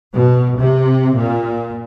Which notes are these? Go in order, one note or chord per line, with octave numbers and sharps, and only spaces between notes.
B2
C3
A#2